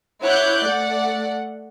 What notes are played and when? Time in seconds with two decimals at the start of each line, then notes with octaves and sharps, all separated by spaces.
0.22 E4 C#5 F#5 D6 F#6 G6
0.65 A3 D5 F#5